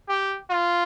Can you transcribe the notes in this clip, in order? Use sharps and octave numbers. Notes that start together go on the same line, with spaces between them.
G4
F4